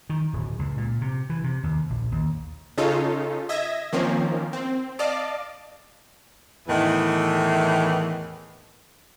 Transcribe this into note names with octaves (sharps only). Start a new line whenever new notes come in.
D#3
D1
C#2
A#2
C3
E3
C3
D#2
A#1
D#2
C#3 C#4 D#4 F4 A4
D#5 E5 G#6 A#6
D#3 F3 A#3 C4 C#4
C4
D5 D#5 F5 A5 D6
E2 A2 D#3 E3